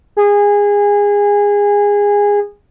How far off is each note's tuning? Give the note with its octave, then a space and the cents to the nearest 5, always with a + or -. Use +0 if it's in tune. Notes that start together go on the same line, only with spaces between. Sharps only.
G#4 -20